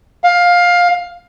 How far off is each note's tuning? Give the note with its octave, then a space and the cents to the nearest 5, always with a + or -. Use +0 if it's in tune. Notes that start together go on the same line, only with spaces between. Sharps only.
F5 +15